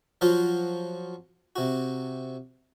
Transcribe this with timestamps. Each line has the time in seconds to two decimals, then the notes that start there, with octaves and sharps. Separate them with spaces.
0.21 F3 F#3 F4 F#4 C5
1.56 C3 F#4